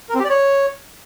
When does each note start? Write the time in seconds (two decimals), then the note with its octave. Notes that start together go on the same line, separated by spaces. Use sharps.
0.09 A#4
0.14 C4
0.19 G4
0.25 D5
0.30 C#5